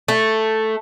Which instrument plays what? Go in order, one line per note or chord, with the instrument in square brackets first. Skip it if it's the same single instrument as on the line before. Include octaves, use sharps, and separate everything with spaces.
[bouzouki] A3